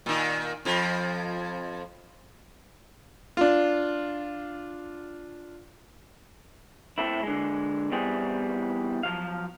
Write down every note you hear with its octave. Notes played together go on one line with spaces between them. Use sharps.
A#2 D#3
F2 F3
D4 F4
A3 C4 E4
D3 G#3
E2 E3 G3 C4 G#4
F3 F#3 F5